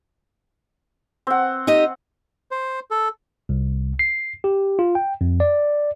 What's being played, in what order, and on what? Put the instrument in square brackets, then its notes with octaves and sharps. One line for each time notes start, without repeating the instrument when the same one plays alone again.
[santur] C4 F#5
[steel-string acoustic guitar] D#4 G4 D#5
[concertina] C5
A4
[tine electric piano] C2
C7
G4
F4
G5
F2
D5